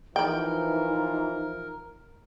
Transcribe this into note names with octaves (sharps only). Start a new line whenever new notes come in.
E3 F3 D#4 A#4 G5 B5